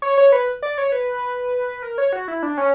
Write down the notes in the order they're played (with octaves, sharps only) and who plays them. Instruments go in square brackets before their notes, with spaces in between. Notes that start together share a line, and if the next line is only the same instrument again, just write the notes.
[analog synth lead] C#5
C#5
B4
D5
C#5
B4
A#4
C#5
F#4
E4
D4
C#4